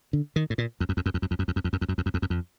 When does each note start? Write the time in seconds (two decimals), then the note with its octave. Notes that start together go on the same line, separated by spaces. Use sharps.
0.13 D3
0.36 D#3
0.50 A2
0.58 A#2
0.80 F2
0.89 F#2
0.97 F2
1.06 F#2
1.14 F2
1.22 F#2
1.31 F2
1.39 F#2
1.48 F2
1.56 F#2
1.64 F2
1.73 F#2
1.81 F2
1.89 F#2
1.98 F2
2.06 F#2
2.14 F2
2.22 F#2
2.30 F2